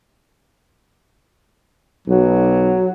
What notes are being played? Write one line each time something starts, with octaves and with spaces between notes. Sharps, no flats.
B1 F#3